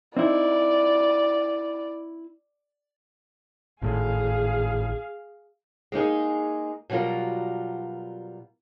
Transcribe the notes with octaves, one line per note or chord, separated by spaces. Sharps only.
C4 D#4 E4 D5
G#1 A2 G#4 F5
G#3 A#3 D#4 G#4
B2 F#3 G3 F4 A#4